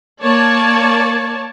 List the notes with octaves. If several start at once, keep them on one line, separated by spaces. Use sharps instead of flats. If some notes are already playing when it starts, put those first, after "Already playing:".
A#3 C#5 D5 A5